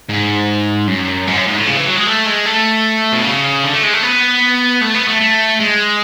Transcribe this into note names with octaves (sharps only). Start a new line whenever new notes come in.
G#2
F#2
G#2
F#2
G#2
A2
C#3
E3
F#3
G#3
A3
G#3
A3
B2
C#3
D3
A3
G#3
A3
B3
A3
B3
A3
A3
G#3